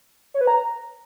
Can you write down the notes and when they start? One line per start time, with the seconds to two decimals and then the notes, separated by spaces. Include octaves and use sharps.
0.34 C#5
0.41 B4
0.47 A#5